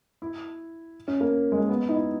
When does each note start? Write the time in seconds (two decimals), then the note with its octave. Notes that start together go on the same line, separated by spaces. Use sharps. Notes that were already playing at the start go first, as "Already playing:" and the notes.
0.22 E4
1.08 C#4
1.21 A#3
1.52 G#3
1.60 A#3
1.69 B3
1.89 D#4
1.94 E4